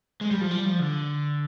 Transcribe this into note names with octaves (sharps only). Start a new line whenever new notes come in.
G#3
G3
F3
G3
F3
D3